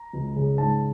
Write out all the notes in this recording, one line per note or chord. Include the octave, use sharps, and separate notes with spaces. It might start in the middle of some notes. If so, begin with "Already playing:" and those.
Already playing: A#5
C#2
C#3
G#2 A5